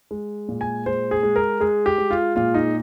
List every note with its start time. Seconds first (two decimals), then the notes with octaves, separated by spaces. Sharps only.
0.11 G#3
0.49 A#2
0.61 G#5
0.86 G#3 C5
1.11 G#4
1.23 G#3
1.36 A#4
1.60 G#3 G#4
1.86 G4
1.98 G#3
2.10 F4
2.36 A#2 F4
2.54 D#4